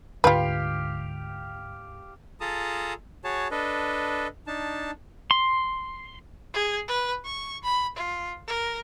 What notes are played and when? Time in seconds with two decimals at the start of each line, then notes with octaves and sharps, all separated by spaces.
0.24 D2 G#2 D3 F4 G4 B4 F5
2.41 F4 G#4 A4 A5 A#5 D#6
3.24 F#4 G#4 C#5 A5
3.51 D4 A4 B4 D#5
4.47 D4 D#4 A5
5.31 C6
6.54 G#4
6.88 B4
7.24 C#6
7.63 B5
7.96 F4
8.47 A#4